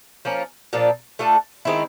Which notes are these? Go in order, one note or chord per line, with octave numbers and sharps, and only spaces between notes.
F3 A#3 C#4
A#2 F3 A#3 D4
A3 D4 F4 A4
D#3 G#3 C4 E4